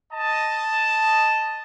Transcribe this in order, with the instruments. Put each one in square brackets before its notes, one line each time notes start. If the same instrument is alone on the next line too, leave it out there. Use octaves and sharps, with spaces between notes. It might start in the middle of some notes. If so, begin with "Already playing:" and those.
[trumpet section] D#5 A5